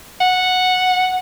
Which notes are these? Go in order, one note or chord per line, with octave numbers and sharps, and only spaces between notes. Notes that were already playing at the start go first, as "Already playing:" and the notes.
F#5